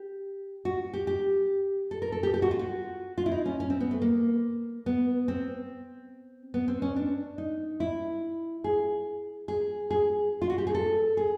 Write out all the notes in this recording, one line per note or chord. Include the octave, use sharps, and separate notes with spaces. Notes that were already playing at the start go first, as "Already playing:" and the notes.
Already playing: G4
F#4
G4
G4
A4
A#4
A4
G4
G4
F#4
F4
F#4
F4
E4
D#4
C#4
C#4
C4
B3
A3
A#3
B3
C4
B3
C4
C#4
D4
D#4
E4
G#4
G#4
G#4
F4
F#4
G4
G#4
A4
G#4